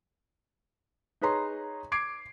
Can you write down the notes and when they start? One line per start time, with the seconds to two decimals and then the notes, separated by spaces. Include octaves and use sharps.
1.22 D#4 G#4 B4 C#5 A#5 C6
1.92 D6 G#6 C7 D7